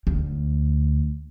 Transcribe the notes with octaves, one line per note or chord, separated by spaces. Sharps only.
D2